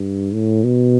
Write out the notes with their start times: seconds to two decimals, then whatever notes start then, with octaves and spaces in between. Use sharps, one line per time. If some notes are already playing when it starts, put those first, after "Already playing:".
Already playing: G2
0.34 A2
0.64 B2